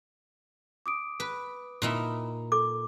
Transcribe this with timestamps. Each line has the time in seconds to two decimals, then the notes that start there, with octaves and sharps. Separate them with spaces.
0.86 D6 D#6 D7
1.20 B4
1.82 A#2 D#4 E4
2.52 A4 D6